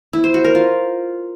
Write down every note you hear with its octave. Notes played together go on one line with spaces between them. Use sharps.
E4
C5
F#4
A#4
F4